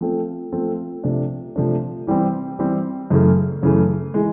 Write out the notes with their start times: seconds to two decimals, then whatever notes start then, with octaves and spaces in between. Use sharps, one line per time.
0.01 F3 A3 C4 F4 A4
0.52 F3 A3 C4 F4 A4
1.04 C3 F3 A3 D4
1.56 C3 F3 A3 D4
2.07 E3 G3 C4
2.59 E3 G3 C4
3.10 F#2 C#3 E3 A3
3.63 F#2 C#3 E3 A3
4.14 E3 G#3